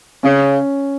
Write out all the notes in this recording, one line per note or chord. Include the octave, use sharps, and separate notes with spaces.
C#3 C#4